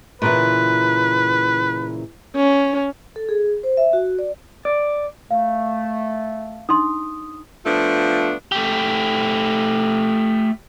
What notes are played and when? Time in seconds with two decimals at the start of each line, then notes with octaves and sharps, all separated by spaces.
0.22 A#2 C#3 E3 B4
2.37 C#4
3.16 A4
3.29 G#4
3.63 C5
3.77 E5
3.93 F#4
4.19 D5
4.65 D5
5.31 A3 F5
6.69 D4 D#4 C6 D#6
7.65 F3 A3 B3 D4 F4
8.52 A3 G4